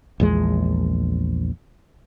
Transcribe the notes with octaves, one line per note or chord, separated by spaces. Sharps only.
A#1 E2 G#3